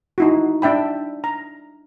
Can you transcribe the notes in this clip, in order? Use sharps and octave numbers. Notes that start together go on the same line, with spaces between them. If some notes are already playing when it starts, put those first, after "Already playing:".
D#4 E4 F#4
D4 E5 G5 B5
A#5